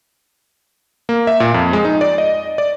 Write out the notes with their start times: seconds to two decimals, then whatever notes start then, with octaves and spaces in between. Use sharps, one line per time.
1.09 A#3
1.27 E5
1.40 A#2
1.54 F2
1.73 G#3
1.85 D#4
2.01 D5
2.18 D#5
2.58 D5